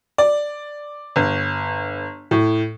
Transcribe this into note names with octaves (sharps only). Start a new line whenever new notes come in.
D5
G1
A2